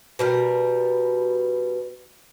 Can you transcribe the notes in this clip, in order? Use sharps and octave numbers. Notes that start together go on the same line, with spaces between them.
B2 G3 A#4